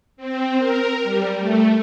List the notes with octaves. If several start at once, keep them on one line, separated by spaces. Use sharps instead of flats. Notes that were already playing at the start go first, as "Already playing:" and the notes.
C4
A#4
G3
A3